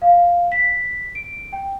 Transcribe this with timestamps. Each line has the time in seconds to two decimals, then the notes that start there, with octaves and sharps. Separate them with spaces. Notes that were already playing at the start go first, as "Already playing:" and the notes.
0.02 F5
0.52 B6
1.15 D7
1.53 G5